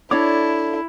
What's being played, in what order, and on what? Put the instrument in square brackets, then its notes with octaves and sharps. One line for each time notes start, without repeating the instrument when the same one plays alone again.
[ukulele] D4 C#5 [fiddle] E4 [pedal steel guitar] A4 D5 D6